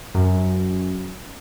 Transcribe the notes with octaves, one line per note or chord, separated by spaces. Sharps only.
F#2